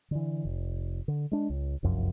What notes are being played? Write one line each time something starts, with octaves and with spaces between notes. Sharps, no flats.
D3 E3
F1
D3
G#3 D4
C#2
F1 C2 F#2 F3